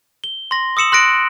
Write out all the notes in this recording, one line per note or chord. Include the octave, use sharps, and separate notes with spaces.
G7
C6 A#6
D#6 E6 C#7 E7 F#7
C6 F#6 A#6 D7